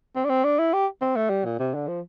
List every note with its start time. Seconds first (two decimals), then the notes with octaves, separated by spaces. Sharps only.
0.16 C4
0.25 D4
0.29 C4
0.44 D4
0.59 E4
0.73 G4
1.01 C4
1.16 A3
1.30 G3
1.45 A#2
1.59 C3
1.74 D3
1.88 F3